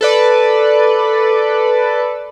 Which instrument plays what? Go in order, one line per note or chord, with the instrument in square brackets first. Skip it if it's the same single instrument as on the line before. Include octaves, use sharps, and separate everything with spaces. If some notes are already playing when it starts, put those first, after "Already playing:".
[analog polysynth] A4 B4 D5